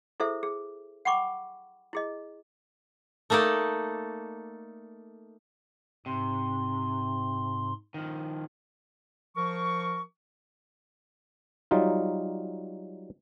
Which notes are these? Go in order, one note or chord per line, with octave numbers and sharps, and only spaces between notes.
E4 G#4 A4 C5 E5
G#4
F#5 G5 B5 C#6 D6
E4 G#4 D#5
A3 A#3 D#4 A4 D5
G#2 C3 C6
D#3 F3
F3 A#4 C#6
F#3 G3 D#4 F4